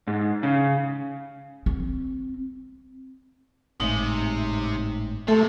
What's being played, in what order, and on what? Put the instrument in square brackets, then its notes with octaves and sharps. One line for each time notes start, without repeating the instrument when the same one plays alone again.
[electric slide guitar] G#2
C#3
[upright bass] C4
[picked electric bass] G#1 A2 G#3 [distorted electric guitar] C3 [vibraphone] D#4
[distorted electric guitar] C3 [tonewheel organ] A3 [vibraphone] A4